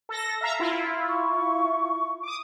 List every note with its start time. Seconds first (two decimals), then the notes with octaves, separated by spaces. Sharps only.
0.09 A4 A#6
0.41 E5 F5 A#5
0.60 E4 F4
1.09 C#6
2.23 D6 D#6